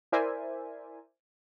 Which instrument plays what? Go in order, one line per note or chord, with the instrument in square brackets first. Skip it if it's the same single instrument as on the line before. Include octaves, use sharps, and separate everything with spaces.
[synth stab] E4 A#4 C5 D5 E5 G#5